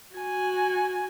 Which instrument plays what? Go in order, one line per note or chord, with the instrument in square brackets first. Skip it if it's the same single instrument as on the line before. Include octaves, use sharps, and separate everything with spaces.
[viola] F#4 G#5